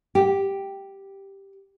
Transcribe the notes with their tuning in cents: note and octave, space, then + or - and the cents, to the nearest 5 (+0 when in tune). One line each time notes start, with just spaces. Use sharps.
G4 +0